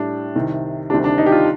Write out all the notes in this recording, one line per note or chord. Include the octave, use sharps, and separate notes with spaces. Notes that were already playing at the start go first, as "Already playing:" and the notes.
Already playing: A2 G3 D4
C2 C3 D#3
D2 C3 D#3 G3 D4
D4
D#4
G4
F4